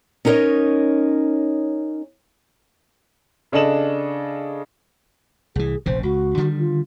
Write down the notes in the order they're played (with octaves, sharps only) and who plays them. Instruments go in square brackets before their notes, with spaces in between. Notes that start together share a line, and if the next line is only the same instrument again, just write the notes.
[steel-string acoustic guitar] C#4 D#4 A#4 C5 C#5 D#5
[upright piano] C#3 D4 A4 D#5 E7 F#7
[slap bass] C2 E3 [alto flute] G#4
[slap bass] F1 A#1 C#3 [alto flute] C5
[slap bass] C#2 [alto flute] F#4
[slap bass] D3 D#3 G3
[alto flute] F4